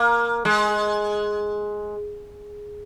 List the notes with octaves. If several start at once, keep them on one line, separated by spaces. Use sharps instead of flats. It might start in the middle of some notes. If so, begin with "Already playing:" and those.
Already playing: A#3
G#3